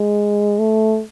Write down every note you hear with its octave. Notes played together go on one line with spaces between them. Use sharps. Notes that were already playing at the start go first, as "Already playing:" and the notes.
Already playing: G#3
A3